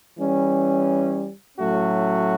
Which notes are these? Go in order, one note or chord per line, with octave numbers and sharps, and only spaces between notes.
E3 G3 C#4
A2 F#3 A3 C#4 F#4